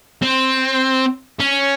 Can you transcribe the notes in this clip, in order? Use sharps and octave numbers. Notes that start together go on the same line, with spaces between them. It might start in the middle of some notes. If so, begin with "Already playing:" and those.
C4
C#4